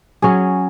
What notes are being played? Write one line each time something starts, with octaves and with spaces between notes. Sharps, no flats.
F#3 C#4 G#4